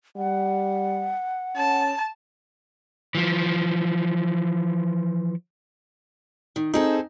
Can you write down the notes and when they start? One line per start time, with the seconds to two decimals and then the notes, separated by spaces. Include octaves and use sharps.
0.17 G3 F#5
1.57 C#4 A5
3.15 E3 F3
6.56 D#3
6.74 C4 D#4 G#4 A4